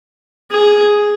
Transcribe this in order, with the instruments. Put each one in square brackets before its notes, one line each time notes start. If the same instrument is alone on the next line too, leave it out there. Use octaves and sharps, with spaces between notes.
[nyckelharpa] G#4